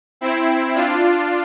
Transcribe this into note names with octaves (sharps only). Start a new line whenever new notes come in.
C4 E4
D4 F4